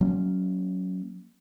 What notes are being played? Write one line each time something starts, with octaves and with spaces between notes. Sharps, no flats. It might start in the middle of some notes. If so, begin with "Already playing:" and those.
F#3 A#3 C#4